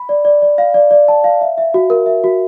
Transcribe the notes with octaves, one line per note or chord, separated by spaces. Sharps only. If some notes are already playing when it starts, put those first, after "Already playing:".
Already playing: B5
D5
D5
D5
F5
D5
D5
A5
F5
E5
E5
F#4
A#4
E5
F#4